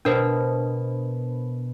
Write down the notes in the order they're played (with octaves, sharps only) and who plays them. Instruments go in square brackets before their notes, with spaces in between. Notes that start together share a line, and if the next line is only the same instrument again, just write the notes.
[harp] B2 [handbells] D4 A#4 C5